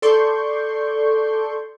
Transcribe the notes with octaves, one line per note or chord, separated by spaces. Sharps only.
A4 D5 C6 C#6 G6